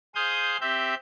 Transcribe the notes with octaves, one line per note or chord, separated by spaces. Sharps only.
G#4 C5 F5 D#6 G6
C4 G4 E5 G6